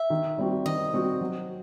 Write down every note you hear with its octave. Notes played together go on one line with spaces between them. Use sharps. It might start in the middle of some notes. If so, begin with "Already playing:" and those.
Already playing: E5
D#3
G3 C4 F#4
D#3 D#5
G3 C4 F#4
F#3